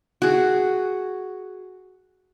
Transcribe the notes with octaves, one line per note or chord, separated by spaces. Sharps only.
F#4 G#4